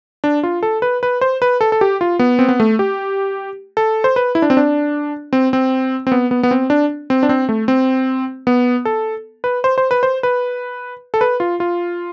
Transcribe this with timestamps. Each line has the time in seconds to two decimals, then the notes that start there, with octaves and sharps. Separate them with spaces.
0.24 D4
0.43 F4
0.63 A4
0.82 B4
1.03 B4
1.21 C5
1.42 B4
1.61 A4
1.72 A4
1.81 G4
2.01 F4
2.19 B3
2.39 C4
2.49 B3
2.60 A3
2.79 G4
3.77 A4
4.04 C5
4.16 B4
4.35 E4
4.42 D4
4.50 C4
4.57 D4
5.33 C4
5.53 C4
6.07 C4
6.12 B3
6.31 B3
6.43 B3
6.51 C4
6.70 D4
7.10 C4
7.23 D4
7.29 C4
7.49 A3
7.68 C4
8.47 B3
8.85 A4
9.44 B4
9.64 C5
9.78 C5
9.91 B4
10.03 C5
10.23 B4
11.14 A4
11.21 B4
11.40 F4
11.60 F4